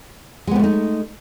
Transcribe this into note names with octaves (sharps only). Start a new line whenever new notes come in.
G#3 A3 B3 C4 D#4